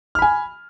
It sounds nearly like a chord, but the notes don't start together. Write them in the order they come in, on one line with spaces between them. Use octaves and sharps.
F6 B5 G#5